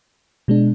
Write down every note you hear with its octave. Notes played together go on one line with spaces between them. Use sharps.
B2 G#3 D4